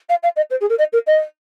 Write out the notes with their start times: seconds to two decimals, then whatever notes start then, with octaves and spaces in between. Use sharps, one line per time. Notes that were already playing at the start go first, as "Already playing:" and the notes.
0.09 F5
0.23 F5
0.36 D#5
0.50 C5
0.60 G#4
0.69 A#4
0.78 D#5
0.93 A#4
1.07 D#5